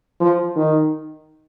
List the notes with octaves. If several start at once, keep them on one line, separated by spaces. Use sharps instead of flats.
F3
D#3